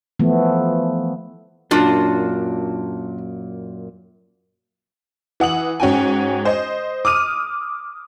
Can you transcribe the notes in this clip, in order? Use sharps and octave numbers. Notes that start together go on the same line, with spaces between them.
E3 F3 A3 B3
F#2 A#2 D4 F4 F#4
E3 F#5 D#6 F#7
G#2 C#4 F#4 G5 G#5
C5 D#5
D6 D#6 F6 D#7